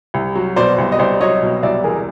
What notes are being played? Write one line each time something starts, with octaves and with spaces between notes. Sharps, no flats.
C2
F#3
B2 C5 D5
C2
D#5
C2 C5 D5
F#3 C#5 D#5
B2
C2 D5 E5
E2 G#4 A#4